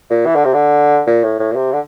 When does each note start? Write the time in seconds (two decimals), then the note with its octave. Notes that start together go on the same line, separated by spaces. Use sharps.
0.10 A#2
0.26 E3
0.35 D3
0.45 C3
0.54 D3
1.07 A#2
1.23 A2
1.39 A2
1.51 A#2
1.56 C3
1.72 D3